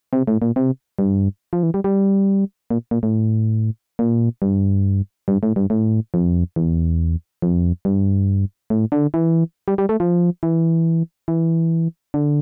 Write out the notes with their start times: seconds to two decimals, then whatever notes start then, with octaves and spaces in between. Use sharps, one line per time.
0.13 C3
0.27 A2
0.42 A#2
0.56 C3
0.99 G2
1.53 F3
1.63 E3
1.74 G3
1.84 G3
2.71 A#2
2.91 A#2
3.03 A2
3.99 A#2
4.42 G2
5.28 G2
5.43 A2
5.56 G2
5.70 A2
6.14 F2
6.56 E2
7.42 F2
7.85 G2
8.70 A2
8.92 D3
9.14 E3
9.68 G3
9.78 G3
9.89 A3
10.00 F3
10.43 E3
11.28 E3
12.14 D3